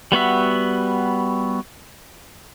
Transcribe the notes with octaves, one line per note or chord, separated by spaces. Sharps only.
G3 B3 F#4 E5